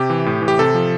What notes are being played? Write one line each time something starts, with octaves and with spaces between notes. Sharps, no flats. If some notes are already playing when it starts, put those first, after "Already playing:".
Already playing: C3 G4
E3
A2
E3
G4
C3 A4
F3